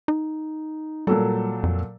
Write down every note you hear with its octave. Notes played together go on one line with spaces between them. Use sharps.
D#4
A#2 F#3 G3 A4
F2